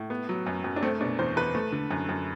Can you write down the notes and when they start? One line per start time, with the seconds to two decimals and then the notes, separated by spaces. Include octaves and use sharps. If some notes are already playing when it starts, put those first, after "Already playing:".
Already playing: A2
0.10 B3
0.29 F#3
0.46 F#2
0.64 F#2
0.76 D4
0.83 A3 C4
1.01 B2 D4
1.19 E2 C5
1.36 E2 B4
1.55 A3
1.72 D3
1.91 F#2
2.09 F#2